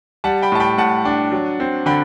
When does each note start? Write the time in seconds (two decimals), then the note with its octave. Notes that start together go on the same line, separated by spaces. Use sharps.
0.24 G3 F#5 A5
0.42 G5 B5
0.52 A2 A5
0.60 G5 B5
0.78 A2 F#5 A5
1.05 D4
1.32 F#3
1.60 C4
1.86 D3 G5 B5